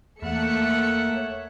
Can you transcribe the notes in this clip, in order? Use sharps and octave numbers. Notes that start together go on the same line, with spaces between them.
E2 A3 A#3 E5 F#5 C#7
C#5